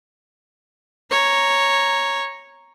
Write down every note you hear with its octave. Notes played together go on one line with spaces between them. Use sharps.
C#5 A#5